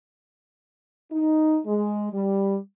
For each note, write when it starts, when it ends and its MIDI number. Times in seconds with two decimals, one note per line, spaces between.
1.11 1.59 63
1.66 2.10 56
2.13 2.56 55